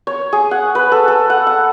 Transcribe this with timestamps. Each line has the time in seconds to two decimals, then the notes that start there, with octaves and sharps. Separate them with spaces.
0.07 C#5
0.33 G#4
0.51 F#5
0.75 B4
0.92 A4
1.08 A4
1.30 F#5
1.47 F#5